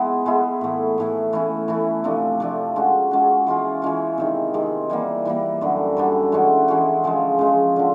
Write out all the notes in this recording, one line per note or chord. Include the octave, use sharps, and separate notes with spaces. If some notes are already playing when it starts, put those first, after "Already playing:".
Already playing: G#3 B3 E4
G#3 B3 E4
A2 E3 A3
A2 E3 A3
E3 A3 C#4 E4
E3 A3 C#4 E4
C3 F3 A3 D4
C3 F3 A3 D4
G#3 C#4 F#4
G#3 C#4 F#4
E3 G#3 C#4 F4
E3 G#3 C#4 F4
C3 D#3 G#3
C3 D#3 G#3
E3 G3 A#3
E3 G3 A#3
F#2 D3 G3
F#2 D3 G3
E3 G#3 C#4 F#4
E3 G#3 C#4 F#4
C#3 F3 G#3
C#3 F3 G#3
D3 F3